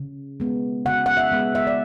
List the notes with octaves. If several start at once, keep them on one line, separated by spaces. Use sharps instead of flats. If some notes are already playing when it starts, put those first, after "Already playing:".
Already playing: C#3
G#3 B3
C#3 F#5
F#5
E5
G#3 B3
E5
D5